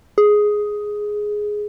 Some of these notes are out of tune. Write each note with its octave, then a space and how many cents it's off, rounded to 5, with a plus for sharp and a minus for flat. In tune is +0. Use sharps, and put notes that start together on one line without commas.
G#4 +5